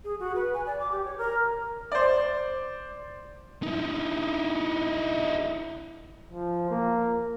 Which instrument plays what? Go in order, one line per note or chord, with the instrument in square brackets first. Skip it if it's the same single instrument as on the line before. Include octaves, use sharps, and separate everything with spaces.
[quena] G#4
F#4
B4
G#5
D5
D6
G4
C#5
A#4
[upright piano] C5 D5
[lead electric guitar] D#4 E4
[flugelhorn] F3
A#3